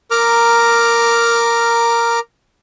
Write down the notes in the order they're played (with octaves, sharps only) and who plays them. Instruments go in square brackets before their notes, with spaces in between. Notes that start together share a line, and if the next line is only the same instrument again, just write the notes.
[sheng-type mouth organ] A#4 A#5 D6 F6